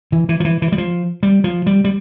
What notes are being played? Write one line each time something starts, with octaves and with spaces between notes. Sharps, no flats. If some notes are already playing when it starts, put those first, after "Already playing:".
E3
E3
F3
E3
E3
G3
F3
G3
F3
G3
G3